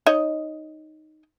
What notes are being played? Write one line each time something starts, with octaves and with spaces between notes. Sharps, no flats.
D#4 C#5 D#5